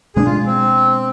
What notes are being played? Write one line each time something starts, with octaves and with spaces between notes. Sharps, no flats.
B2 G#3 B3 D4 G#4
F4
C4